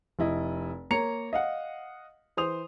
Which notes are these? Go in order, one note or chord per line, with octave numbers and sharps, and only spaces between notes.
F1 E4 D#5
A#3 C#5 A#5 C#7 F7
D#5 F5 F#5
E3 C5 C6 D#6 F7